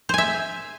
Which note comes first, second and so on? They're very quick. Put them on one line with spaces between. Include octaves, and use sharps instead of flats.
C5 G#5 E5